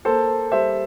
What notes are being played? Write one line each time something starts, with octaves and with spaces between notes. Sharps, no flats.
A#3 A4 C5
G3 C5 E5